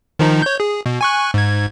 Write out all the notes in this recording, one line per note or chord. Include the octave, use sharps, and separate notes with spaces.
D#3 F3 D#4
C#5 G6
G#4
B2
G#5 C#6 F#6
G#2 G#6